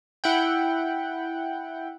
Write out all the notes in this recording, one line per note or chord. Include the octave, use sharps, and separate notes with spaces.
E4 F#5 G5